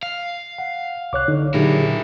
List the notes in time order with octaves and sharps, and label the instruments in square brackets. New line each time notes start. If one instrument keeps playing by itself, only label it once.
[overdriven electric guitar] F5
[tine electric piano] F#5
[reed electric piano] C2 C#5 [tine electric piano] D6 F#6
[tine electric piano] D3 [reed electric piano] D#4 C#5
[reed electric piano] A#2 D3 F#3 [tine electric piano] D#4 G4 G#4 [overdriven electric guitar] E4 A#4